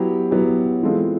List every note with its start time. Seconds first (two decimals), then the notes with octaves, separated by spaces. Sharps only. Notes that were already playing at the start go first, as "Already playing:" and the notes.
Already playing: F#3 B3 E4 G4
0.31 F#3 B3 E4 G4
0.83 E3 G#3 C4 F4 A4